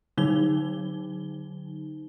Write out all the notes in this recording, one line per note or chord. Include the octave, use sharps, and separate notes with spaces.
D3 F#3 D#4 G7